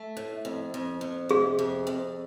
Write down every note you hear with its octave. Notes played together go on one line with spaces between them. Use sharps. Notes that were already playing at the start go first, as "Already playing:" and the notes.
Already playing: A3
A2
F2
F2
F2
C3 G#4
F2
F2